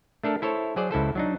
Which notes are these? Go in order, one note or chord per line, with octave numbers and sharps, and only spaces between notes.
A3 D4 A4 A#4
E4 A4 C5 C#5
F#3 G#4 C5 D5
C#2 E4 A4 C5
F#3 D4 D#4